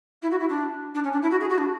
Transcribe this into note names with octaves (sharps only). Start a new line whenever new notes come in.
E4
F#4
E4
D4
D4
C#4
D4
E4
F#4
G#4
F#4
D4